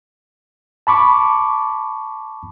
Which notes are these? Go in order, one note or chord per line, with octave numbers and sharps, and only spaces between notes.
A5 B5 C#6 D6